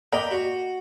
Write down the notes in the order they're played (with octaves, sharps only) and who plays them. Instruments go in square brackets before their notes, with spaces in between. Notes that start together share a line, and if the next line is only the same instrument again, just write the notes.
[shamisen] A#3 D5 D#5 [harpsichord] G5 A#5 B5
[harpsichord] F#4